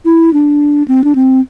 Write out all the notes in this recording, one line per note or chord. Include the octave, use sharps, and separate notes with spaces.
E4
D4
C4
D4
C4